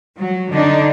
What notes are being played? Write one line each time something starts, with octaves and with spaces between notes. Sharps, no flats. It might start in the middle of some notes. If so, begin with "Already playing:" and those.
F#3
D3 D4 D#4